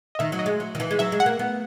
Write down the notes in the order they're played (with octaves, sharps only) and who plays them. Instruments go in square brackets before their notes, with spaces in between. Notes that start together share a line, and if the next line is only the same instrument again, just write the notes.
[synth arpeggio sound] D#5
[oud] D#3 [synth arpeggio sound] E5
[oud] F#3
[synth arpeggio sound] D#5
[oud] G#3
F#3
D#3
E3
G#3
[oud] F#3 [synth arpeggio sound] E5
[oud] G#3
[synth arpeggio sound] F#5
[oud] A#3
B3